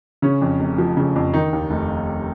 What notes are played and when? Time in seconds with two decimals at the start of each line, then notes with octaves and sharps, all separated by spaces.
0.22 C#3 C#4
0.42 F2
0.60 F1
0.78 F3
0.97 C#3
1.16 F2
1.34 D#3 D#4
1.53 D#2
1.70 F1